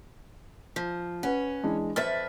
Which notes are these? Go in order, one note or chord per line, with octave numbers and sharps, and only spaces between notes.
F3
C#4 B4 F#5
E3 G#3 D4
F2 B4 E5 F6 A6